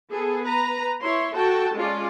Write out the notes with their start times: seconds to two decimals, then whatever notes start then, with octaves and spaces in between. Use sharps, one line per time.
0.12 B3 G#4 A4
0.45 B4 A#5
1.02 E4 C#5 C6
1.36 F#4 A4 G5 A5
1.76 G#3 C#4 F4 D5